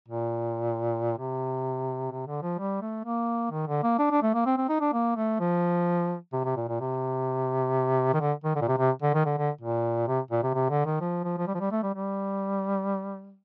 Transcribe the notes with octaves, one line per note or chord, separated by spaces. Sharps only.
A#2
C3
C3
D3
F3
G3
A3
A#3
D#3
D3
A#3
D4
D4
A3
A#3
C4
C4
D#4
D4
A#3
A3
F3
C3
C3
A#2
A#2
C3
D#3
D3
D#3
D3
A#2
C3
C3
D3
D#3
D3
D3
A#2
C3
A#2
C3
C3
D3
D#3
F3
F3
F3
G3
F3
G3
A3
G3
G3